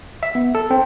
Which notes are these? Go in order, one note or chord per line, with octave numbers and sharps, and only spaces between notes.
E5
B3
A4
C4